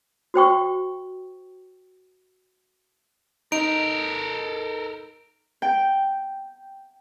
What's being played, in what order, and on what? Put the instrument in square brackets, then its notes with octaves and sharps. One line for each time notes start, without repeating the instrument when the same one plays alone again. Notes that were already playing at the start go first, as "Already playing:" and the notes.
[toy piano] F#4 C5 G5 C#6
[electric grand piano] D#4 [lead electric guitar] A4 A#4 [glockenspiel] D7
[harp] G5